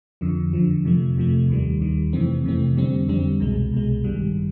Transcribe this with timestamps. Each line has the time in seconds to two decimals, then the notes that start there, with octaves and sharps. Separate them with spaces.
0.21 F2 D3 F3
0.53 F2 D3 F3
0.85 F2 C3 F3 A3
1.17 F2 C3 F3 A3
1.49 D#2 D#3 G3
1.80 D#2 D#3 G3
2.13 F2 C3 E3 A3 C4
2.44 F2 C3 E3 A3 C4
2.76 F2 D3 G3 C4
3.08 F2 D3 G3 C4
3.40 C2 B2 G#3
3.73 C2 B2 G#3
4.04 A1 G2 D#3 G3